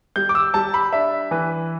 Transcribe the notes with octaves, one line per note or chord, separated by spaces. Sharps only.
G3 G6
D6
E6
G3 A5
B5
D4 E5
E3 B4